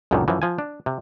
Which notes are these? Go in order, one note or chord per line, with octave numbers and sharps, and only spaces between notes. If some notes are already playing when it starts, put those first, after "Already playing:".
C#2 F#2 A#2 D3 D#3
F#2 E3 F3
F3 G#5
D4
C3